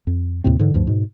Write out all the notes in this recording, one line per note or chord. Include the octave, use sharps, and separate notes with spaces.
F2
D#2 A2 C3 C4
G#2 D3 E3
D2 G2 F3
G#2 B2